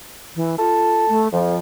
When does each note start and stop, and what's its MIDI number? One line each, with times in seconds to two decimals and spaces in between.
0.36 0.56 52
0.59 1.05 65
0.59 1.25 69
1.09 1.28 57
1.33 1.57 41
1.33 1.59 53